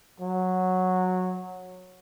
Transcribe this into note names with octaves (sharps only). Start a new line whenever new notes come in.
F#3